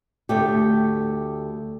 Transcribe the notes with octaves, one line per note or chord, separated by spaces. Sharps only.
D2 A3 G4